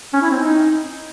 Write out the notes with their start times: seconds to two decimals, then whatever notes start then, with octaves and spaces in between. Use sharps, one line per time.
0.13 C#4
0.22 E4
0.30 C4
0.39 D#4